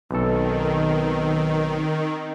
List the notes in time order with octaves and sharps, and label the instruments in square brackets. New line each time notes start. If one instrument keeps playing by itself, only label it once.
[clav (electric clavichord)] B1 A4 [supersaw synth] D#3 [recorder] C4